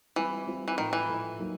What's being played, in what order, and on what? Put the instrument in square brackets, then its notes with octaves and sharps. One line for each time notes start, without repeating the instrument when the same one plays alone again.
[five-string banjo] E3 [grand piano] G3 C4 F4
[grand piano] G3 C4 F4
[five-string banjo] E3
[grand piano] A2 F3 A3 [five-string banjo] D#3
[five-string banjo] E3
[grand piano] A2 F3 A3
F#3 A#3 D#4